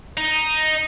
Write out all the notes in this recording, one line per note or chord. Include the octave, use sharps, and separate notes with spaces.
D#4